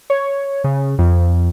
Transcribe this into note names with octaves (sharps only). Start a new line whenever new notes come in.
C#5
C#3
F2